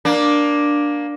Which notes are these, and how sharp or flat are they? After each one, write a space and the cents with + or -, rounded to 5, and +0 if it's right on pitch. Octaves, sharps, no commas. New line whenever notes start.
A#3 +15 D4 +0